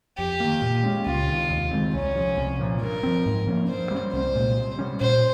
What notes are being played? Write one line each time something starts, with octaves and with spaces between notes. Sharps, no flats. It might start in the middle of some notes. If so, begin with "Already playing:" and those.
F2 G4
D#3 A#3
A#2
G#3 C#4
C#2 F4
C3 D#3
D#2
D#3 G#3 C4
C2 C#4
C3 F3
C2
A#2 F3
G2 A#4
F3 C4
G#2
F3 A#3 C#4
G2 C5
G3 A#3 C#4
C2 C5
A#2 G#3
C3
G3 C#4
A#2 C5